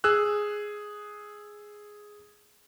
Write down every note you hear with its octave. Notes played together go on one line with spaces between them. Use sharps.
G#4 E6 F#6